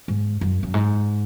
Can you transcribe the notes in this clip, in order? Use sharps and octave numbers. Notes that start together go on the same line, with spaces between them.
G#2
F#2
F#2
G#2